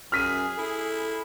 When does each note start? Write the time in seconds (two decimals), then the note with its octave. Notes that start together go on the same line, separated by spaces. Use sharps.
0.12 F#2 G#4 F6 B6 D#7
0.58 E4 A4